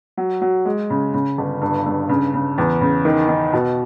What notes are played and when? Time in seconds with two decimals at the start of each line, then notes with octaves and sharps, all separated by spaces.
0.17 F#3
0.42 F#3
0.65 G#3
0.90 C#3
1.14 C#3
1.38 G1
1.61 G2
1.86 G2
2.09 C#3
2.34 C#3
2.58 E2
2.81 C#3
3.05 D#3
3.28 D#3
3.53 B2